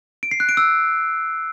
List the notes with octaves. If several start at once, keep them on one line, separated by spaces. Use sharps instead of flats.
D7
C7
F#6
D7
E6